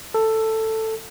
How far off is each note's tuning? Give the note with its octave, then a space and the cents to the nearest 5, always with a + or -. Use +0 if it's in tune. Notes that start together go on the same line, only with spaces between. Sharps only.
A4 +10